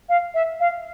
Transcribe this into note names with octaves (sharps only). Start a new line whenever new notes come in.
F5
E5
F5